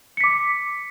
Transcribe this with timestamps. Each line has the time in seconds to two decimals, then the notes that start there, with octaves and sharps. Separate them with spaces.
0.17 C#7
0.20 B6
0.24 D6